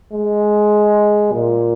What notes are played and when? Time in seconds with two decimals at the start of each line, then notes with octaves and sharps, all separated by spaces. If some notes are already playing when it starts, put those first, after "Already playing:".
0.12 G#3
1.32 A#2